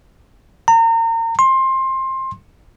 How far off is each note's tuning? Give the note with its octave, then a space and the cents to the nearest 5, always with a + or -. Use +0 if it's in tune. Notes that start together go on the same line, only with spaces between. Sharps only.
A#5 -35
C6 +20